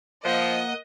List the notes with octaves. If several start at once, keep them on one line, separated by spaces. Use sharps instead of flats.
F3 A#3 D#5 F#5